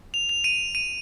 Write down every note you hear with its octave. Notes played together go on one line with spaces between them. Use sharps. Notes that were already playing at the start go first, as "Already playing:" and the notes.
F7
F7
D#7
D#7